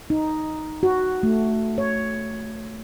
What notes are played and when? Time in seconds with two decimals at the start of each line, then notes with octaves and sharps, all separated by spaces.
0.10 D#4
0.83 F#4
1.23 A3
1.78 C#5